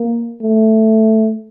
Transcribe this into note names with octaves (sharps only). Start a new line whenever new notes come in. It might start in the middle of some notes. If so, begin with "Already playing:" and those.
Already playing: A#3
A3